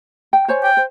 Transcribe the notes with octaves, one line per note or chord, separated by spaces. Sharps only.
G5
C5 C#5 G#5
G5
C5